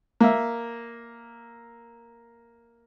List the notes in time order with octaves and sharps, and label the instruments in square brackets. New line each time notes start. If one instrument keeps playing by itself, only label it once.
[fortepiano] A#3 E5